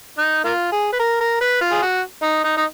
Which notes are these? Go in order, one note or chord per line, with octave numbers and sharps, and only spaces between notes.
D#4
A#3 F4
G#4
B4
A#4
A#4
B4
F4
G#4
F#4
D#4
D#4
D#4